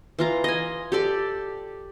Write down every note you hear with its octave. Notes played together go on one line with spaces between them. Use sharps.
E3 F4 A#5
D#5 G#5
G4 A4 D5